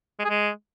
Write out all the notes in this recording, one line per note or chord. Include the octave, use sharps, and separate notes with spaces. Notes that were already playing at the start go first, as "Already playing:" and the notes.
G#3
G#4
G#3